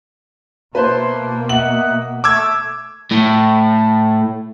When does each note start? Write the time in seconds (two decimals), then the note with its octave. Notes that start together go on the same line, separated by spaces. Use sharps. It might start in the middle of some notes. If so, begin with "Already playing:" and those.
0.75 B2 A#3 E4 B4 C5 A5 C6
1.49 D#5 E5 F#5 F#7
2.24 A3 D6 E6 G#6
3.11 A2